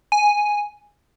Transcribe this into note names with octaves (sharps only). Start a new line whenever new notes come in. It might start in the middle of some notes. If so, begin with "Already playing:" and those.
G#5